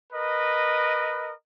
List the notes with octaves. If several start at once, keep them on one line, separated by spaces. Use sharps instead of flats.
A#4 B4 D#5